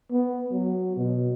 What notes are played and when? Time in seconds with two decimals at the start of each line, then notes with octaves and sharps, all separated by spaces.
0.12 B3
0.52 F#3
0.97 B2